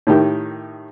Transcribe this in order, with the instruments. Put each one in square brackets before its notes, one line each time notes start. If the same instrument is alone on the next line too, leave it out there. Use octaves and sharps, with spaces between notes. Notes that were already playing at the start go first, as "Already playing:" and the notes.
[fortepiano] A2 D#3 G4